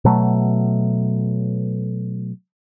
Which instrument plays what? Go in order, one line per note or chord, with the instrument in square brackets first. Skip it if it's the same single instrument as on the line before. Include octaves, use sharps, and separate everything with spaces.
[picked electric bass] B2 F#3 A3